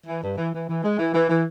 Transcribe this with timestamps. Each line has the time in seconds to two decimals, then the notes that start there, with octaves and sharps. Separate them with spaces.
0.06 E3
0.23 G2
0.37 E3
0.53 E3
0.69 E3
0.84 G#3
0.99 E3
1.14 E3
1.30 E3